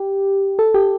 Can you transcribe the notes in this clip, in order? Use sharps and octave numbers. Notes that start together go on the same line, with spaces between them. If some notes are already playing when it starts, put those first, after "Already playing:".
Already playing: G4
A4
G4